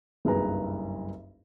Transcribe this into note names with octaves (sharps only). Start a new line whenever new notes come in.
F#1 B1 G2 G#4 B4 A#5